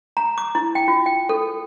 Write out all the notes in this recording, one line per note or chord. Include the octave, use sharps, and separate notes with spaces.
A#5
D6
E4
G5
F4
G5
A4